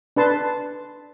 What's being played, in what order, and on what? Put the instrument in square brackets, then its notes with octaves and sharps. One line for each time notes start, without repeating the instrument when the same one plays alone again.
[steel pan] D4 B4 A5 C6